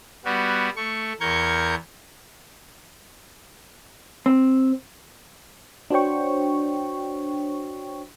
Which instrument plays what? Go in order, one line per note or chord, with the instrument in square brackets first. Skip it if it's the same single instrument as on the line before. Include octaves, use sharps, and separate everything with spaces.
[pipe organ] G3 B3 F#4
A3 C#6
E2 A#4 C#6 G6 G#6
[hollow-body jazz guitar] C4
[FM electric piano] D4 F#4 C5 C#5 G5 C#6